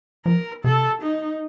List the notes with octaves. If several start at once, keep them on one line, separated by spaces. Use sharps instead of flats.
F3 A#4
C3 A4
D#4